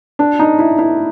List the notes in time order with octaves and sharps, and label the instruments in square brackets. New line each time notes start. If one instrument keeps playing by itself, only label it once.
[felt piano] D4
D#4
E4
E4